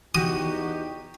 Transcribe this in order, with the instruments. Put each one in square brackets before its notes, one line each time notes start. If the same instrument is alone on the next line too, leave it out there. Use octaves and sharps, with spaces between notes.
[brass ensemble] E2 D#4 G4 [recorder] F#4 [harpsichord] D#6